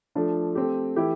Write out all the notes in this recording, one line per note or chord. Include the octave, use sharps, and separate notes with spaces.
F3 A3 D4
A3 C4 G4
E3 A3 E4 G4